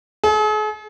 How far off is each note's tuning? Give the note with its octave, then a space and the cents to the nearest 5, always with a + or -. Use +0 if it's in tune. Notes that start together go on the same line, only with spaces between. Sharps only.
G#4 +45